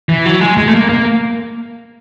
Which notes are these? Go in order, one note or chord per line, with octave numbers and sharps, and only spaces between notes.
E3
F#3
G#3
G#3
A3
A#3
A#3